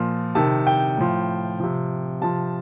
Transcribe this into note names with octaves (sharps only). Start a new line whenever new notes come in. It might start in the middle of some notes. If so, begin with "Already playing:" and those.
Already playing: A#2 F3
C3 D#3 A5
G5
A2 F3
C3 F3
C3 F3 A5